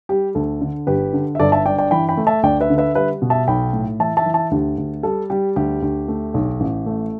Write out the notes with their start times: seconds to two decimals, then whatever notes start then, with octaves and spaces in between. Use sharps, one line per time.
0.09 G3 G4
0.35 D2 A4
0.61 D3
0.87 G1 G4 B4
1.13 D3
1.35 E5
1.39 G1 A4 D5
1.52 E5 A5
1.66 G2 D5 G5
1.78 D5 G5
1.91 E3 G5 B5
2.09 G5 B5
2.17 A3
2.27 E5 A5
2.43 D2 D5 G5
2.61 B4 E5
2.70 D3
2.78 B4 E5
2.95 G3 B4 E5
3.22 B2
3.30 E5 A5
3.48 B1 G5 B5
3.73 A2
3.99 E3 E5 A5
4.17 E5 A5
4.26 E3
4.34 E5 A5
4.51 D2 G4
4.78 D2
5.03 G3 A4
5.30 G3 G4
5.56 D2 G4
5.82 D2
6.08 A3
6.34 B1
6.60 A1
6.86 A3